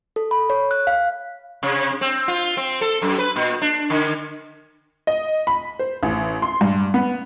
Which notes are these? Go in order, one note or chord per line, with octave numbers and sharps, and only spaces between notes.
A4
B5
C#5
F#6
F5
C3
C4
F4
C4
A4
F#2
B4
A#2
D4
D3
D#5
B5
C5
A1
C6
G2
B3